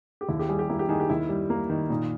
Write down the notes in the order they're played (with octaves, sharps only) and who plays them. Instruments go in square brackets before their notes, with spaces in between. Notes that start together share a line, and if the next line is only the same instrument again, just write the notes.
[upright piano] G4
[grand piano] D#2 [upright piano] E4
[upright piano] G4
[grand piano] G3 [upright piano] G#4
[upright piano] G4
[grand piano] A#3 [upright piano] E4
[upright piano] G4
[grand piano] D#3 [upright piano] G#4
[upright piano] G4
[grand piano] D#2 [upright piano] E4
[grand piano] G3
A#3
D#3
[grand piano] A#2 [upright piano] D#4